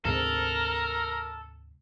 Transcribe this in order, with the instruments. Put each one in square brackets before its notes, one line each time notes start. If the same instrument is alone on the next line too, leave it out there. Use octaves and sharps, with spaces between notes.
[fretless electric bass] D2 G#2 C3 [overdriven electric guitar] A4 [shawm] A#4